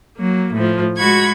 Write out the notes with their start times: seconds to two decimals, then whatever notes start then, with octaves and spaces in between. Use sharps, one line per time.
0.16 F#3 A#3
0.54 A2 F3
0.97 G#3 F#4 B5 C#6 G#6